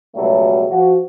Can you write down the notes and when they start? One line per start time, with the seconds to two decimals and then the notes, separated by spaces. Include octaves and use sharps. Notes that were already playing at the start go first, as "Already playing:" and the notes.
0.16 C#2 B2 F#3 G3 A3
0.69 F3 F#4